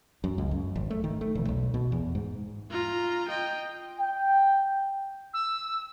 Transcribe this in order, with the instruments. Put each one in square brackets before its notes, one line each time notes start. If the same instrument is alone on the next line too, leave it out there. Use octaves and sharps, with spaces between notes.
[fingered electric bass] F#2
C#2
F#2
G#1
A3
D#3
A3
E1
B1
B2
E2
G#2
[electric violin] F4 A#5
D#5 G5
[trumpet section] G5
[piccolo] E6